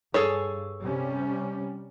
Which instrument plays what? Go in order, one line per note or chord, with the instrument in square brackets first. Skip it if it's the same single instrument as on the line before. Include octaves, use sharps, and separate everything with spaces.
[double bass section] G2 [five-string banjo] G#4 A4 C#5
[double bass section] C3 G3 C#4